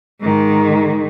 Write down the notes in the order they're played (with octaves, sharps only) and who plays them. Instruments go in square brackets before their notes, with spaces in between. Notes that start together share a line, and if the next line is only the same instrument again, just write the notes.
[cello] G#2 D#3